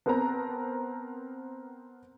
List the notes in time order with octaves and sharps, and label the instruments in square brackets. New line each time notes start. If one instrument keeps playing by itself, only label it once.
[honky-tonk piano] B3 C4 A#4 B4 A5 A#5